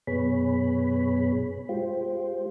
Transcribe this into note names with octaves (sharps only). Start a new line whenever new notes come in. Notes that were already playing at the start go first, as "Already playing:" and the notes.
F#2 B2 B3 G#4 C#5 B5
G#3 F4 G4 C5